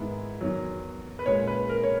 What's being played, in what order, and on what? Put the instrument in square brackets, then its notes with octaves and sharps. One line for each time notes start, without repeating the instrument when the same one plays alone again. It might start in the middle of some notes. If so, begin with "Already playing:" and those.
Already playing: [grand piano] G#2 D#3 G#3 B3 E4
E2 D#3 F#3
B4
A#2 G#3 C#4 C#5
B4
A#4
C#5